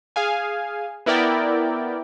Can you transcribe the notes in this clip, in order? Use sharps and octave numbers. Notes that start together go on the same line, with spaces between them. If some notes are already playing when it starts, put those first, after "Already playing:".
G#4 F5 G#5
B3 E4 A#4 D5 G5